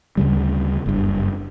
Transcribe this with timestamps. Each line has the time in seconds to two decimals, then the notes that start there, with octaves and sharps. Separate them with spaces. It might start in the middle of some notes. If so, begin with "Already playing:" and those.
0.17 D2 C#3 G3
0.86 F#1 G2